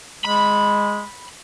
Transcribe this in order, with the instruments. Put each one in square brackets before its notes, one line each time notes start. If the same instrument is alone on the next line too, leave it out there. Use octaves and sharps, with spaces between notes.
[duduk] G#3 [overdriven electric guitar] B5